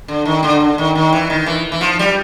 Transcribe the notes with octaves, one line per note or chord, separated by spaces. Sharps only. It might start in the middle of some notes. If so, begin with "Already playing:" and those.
D3
D#3
D3
D3
D#3
D#3
E3
D#3
E3
E3
F3
G3